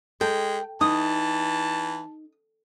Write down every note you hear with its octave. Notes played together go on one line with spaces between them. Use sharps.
G#3 A4 G5
E3 D#4 A5 D#6